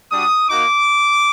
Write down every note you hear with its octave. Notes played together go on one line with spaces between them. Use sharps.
G3 D4 F#4 D#6
A#3 D#4 F#4 D6